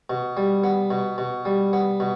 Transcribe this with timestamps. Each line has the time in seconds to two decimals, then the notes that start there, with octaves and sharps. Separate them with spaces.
0.10 B2
0.37 G3
0.64 B3
0.91 B2
1.18 B2
1.45 G3
1.73 B3
2.00 B2